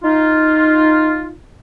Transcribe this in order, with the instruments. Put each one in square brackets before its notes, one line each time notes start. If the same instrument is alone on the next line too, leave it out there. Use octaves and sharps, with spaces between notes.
[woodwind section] D#4 F4